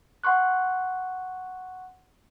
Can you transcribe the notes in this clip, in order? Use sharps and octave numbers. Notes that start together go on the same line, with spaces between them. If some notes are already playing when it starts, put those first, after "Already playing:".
F#5 C6 C#6 F#6